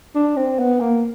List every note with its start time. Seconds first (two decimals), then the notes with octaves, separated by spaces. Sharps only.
0.15 D4
0.36 C4
0.59 B3
0.80 A#3